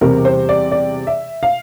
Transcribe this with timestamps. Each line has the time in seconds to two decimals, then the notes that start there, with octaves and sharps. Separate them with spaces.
0.01 E2 C3 G3 C4 A#4
0.25 C5
0.49 D5
0.71 D5
1.07 E5
1.43 F5